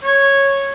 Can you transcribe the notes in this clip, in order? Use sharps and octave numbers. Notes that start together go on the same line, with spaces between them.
C#5